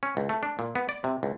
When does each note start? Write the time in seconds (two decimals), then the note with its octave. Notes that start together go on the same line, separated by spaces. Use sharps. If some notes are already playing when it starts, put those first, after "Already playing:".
0.03 C#4
0.17 C#2
0.29 A3
0.43 D4
0.59 A#2
0.75 B3
0.89 D5
1.04 C3
1.23 C#2